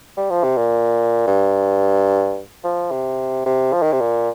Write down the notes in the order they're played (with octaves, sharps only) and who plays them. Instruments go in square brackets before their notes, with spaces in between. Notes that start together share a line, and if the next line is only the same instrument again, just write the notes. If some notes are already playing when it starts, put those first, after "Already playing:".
[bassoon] G3
F3
C3
A#2
G2
F3
C3
C3
F3
D#3
C3
A#2